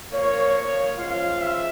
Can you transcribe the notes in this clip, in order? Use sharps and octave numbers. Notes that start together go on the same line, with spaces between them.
A#2 F3 A#3 C#5
F3 G#3 C#4 F4 F5
E5